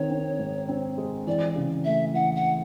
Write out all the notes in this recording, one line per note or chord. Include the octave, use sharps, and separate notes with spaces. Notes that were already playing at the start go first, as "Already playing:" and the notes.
Already playing: D#3 C4 C#5
C4
G#2
C4
G#3
E3 D5
C#3
A3 E5
E3 F#5
F#5